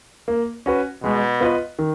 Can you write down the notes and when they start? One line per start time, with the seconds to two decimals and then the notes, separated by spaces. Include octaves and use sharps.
0.28 A#3
0.66 C#4 F#4 B4
1.03 B2 G#3
1.41 B3 F4 B4 D#5
1.79 D#3